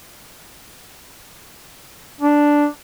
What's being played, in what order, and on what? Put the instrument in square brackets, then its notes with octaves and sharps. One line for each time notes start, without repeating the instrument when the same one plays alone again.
[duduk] D4